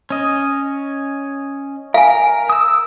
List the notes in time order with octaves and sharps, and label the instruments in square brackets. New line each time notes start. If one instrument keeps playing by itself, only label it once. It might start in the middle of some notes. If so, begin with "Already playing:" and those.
[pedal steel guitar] C#4 D#5
[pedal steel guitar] A#4 [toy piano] F5 G#5
[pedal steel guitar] D#6 E6